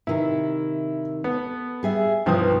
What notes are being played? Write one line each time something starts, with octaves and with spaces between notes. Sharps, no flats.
C3 D#3 E4
B3 A4
G3 G#4 E5
C2 G2 B2 F3 D#4 D#6